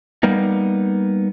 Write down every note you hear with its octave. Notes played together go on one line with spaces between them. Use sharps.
G3 A#3 B3 D#4